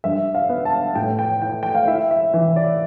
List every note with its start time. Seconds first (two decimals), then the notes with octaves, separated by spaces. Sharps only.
0.04 G2 E5
0.35 F5
0.49 B3
0.65 A5
0.95 A2 G5
1.19 G5
1.42 E4 G5
1.63 G5
1.75 F5
1.87 E4 E5
2.11 E5
2.34 E3
2.56 D5